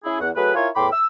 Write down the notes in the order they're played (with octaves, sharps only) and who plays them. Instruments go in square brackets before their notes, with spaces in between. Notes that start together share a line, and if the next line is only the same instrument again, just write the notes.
[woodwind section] C#4 E4 G#4
E2 F#5
F#3 A3 G#4 B4
E4 F4 A#4 C#5 G#5 C6
E2 A2 G5 B5 C6 D6
E6